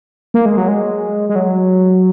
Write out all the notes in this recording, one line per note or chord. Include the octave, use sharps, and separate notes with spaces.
A#3
G#3
F#3
G#3
G#3
F#3